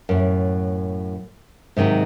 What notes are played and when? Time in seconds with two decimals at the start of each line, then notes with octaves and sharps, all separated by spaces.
0.09 F#2 A2
1.77 G#2 C3 D#3 F#3 D#4